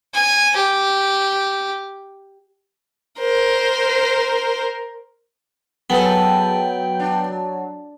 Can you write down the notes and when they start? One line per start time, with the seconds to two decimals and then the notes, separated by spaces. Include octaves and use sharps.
0.14 G#5
0.56 G4
3.19 A#4 C5
5.90 F#3 B3 G#4 A4 B4 G5
7.00 D4